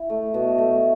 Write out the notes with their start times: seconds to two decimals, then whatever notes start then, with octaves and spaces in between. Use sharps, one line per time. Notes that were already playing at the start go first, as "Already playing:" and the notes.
Already playing: E4
0.10 A3
0.34 B2
0.58 A3